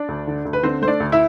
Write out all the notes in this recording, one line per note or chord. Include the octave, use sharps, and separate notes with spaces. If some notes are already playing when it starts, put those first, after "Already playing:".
Already playing: D4 D5
D2
D3
D2
B4
D3 C4 C5
A3 C5
D4 D5
D2
E4 E5